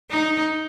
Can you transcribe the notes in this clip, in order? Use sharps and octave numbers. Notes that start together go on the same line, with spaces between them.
D#4